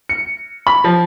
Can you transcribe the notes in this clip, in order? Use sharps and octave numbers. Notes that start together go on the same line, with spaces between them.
C#7
B5
F3